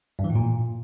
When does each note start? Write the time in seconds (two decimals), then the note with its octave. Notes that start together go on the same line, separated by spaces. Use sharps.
0.19 G2
0.24 E3
0.30 A2
0.35 A#2